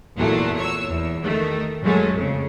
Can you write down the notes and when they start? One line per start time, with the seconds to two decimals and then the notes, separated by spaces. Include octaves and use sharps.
0.16 E2 A#2 F#3 A3
0.56 C#5 E6
0.88 E2
1.22 D#3 A3
1.82 F#2 F#3 G#3 A3 C#4
2.15 F2 C#3